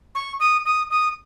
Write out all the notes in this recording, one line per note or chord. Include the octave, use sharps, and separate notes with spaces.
C#6
D#6
D#6
D#6